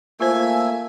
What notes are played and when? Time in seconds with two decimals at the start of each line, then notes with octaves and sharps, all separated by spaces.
0.20 A3 A#3 F4 C5 E5 G#5 E6